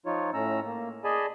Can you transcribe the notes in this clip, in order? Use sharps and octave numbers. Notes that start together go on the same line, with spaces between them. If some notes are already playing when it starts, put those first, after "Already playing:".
F3 D#4 F4 C#5
A2 A3 C#4 A#5 E6
A#3
G#4 D5 D#5 G#5 A5 B5